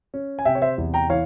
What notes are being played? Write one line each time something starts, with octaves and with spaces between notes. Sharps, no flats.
C#4
G#5
C3 E5 G5
C#5
C5 E5
E2
G5 A#5
E3 C#5 F5